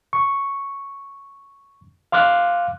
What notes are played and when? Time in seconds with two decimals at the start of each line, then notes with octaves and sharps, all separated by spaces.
0.13 C#6
2.12 F5 C6 D6 F6 F#6